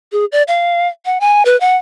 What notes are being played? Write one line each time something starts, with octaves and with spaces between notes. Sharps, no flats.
G#4
D5
F5
F#5
G#5
B4
F#5